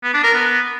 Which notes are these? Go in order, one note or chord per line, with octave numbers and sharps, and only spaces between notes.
B3
D4
A#4
B3